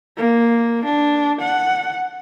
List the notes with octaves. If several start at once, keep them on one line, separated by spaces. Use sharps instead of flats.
A#3
D4
F#5